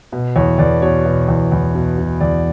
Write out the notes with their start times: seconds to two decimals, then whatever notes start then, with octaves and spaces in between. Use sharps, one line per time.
0.12 B2
0.36 E2 C#5
0.59 E2 D5
0.82 B2 C#5
1.06 B2
1.29 E2
1.52 E2
1.75 B2
1.98 B2
2.20 E2 D5